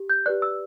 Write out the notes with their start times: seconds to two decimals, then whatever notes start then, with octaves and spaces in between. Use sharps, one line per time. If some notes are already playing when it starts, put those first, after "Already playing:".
Already playing: G4
0.10 G6
0.26 G4 B4 D5 F#6
0.42 E6